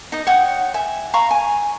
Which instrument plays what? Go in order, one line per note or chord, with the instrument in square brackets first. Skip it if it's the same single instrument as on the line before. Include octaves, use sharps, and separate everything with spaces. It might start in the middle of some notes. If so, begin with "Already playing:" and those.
[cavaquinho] D#4 D#5
C#5 F#5 G5 D#6
E5 G#5
F5 A#5 B5 C#6
G#5